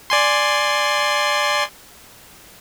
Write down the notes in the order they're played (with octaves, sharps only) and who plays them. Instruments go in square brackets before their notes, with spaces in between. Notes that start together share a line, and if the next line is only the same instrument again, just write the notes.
[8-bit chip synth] D5 G#5 C6